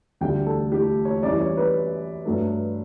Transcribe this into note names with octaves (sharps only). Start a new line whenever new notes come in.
D2 D3 G3 G5
A4
G4
C#5
F#2 E3 G3 D5
C#5
B4
G2 F#3 A3